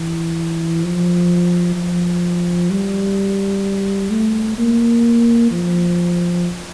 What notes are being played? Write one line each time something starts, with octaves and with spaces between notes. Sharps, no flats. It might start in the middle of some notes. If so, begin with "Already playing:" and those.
Already playing: E3
F3
F3
G3
A3
A#3
F3